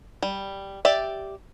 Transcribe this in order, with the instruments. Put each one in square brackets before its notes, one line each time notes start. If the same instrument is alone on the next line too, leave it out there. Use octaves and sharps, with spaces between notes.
[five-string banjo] G3
G4 D5 E5